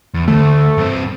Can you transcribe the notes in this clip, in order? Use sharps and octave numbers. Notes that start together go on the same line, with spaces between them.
E2
D2 A3
G2 C4